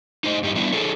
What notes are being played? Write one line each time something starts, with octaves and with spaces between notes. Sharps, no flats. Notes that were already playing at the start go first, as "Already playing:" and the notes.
D#4 C5 D#5
G2 G3 C#4 D#4
G3 B3 D4 E4
D#4 G#4 A4 C#5